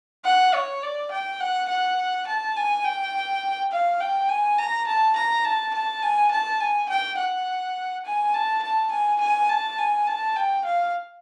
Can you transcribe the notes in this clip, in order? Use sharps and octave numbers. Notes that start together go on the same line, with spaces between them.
F#5
C#5
D5
G5
F#5
F#5
A5
G#5
G5
F5
G5
G#5
A#5
A5
A#5
A5
A5
G#5
A5
G#5
G5
F#5
G#5
A5
A5
G#5
G#5
A5
G#5
A5
G5
F5